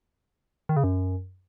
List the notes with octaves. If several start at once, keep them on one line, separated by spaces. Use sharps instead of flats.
D#3
C#3
F#2